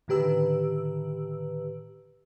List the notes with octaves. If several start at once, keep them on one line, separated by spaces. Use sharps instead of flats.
A2 D3 D#3 G4 B4 E6